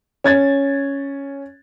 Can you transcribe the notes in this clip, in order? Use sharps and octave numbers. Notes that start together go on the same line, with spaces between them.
C#4 G#6 A6